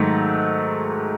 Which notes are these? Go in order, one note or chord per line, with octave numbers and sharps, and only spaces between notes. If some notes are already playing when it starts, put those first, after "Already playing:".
Already playing: G#2 D#3 F#3 A3